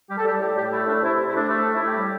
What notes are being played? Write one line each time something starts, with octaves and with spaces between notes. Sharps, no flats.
G3 G4
A4
G3 G4
A2 G4
A2 G4
A3 E4
A3 D4
C3 E4
C3
E4
A3 D4
A3
A2
E4
A2 G4
G3